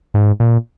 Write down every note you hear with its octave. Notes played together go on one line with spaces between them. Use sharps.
G#2
A#2